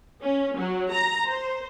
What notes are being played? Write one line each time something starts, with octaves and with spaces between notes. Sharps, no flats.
C#4
F#3
A#5
C5